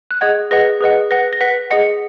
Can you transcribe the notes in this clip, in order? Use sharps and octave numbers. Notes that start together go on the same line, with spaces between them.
F#6
G#4 D#5 F#5 G#6
G#4 B4 D#5 F#5 A#6
G#4 B4 D#5 F#5
B4 F#5 A#6
A#6
B4 F#5 B6
G#4 D#5 F#5 C#7